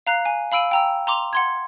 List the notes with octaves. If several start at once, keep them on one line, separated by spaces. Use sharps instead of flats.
F5 A#5 F#6 C7
G#5
F5 B5 E6 D7 D#7
G5 A#5 E6
A#5 C6 D6 F7
F#5 C6 G#6